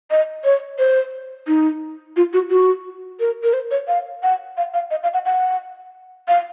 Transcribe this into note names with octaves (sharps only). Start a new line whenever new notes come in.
D#5
C#5
C5
D#4
F4
F#4
F#4
A#4
A#4
C5
C#5
F5
F#5
F5
F5
D#5
F5
F#5
F#5
F5